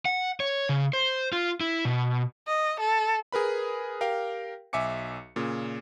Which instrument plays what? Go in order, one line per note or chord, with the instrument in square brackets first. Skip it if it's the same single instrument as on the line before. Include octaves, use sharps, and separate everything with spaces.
[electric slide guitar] F#5
C#5
C#3
C5
F4
E4
B2
[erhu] D#5
A4
[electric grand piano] G#4 A#4 B4 B5
G4 A#4 F5 G5
B1 E5 G#5 D6 C#7
A#2 C#3